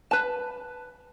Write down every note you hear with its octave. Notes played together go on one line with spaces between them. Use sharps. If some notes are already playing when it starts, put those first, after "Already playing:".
B4 A5